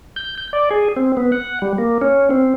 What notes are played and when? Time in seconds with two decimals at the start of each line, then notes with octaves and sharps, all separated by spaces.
0.16 G6
0.38 G6
0.53 D5
0.71 G#4
0.96 C4
1.17 B3
1.32 F#5
1.62 G3
1.78 A#3
2.02 C#4
2.30 C4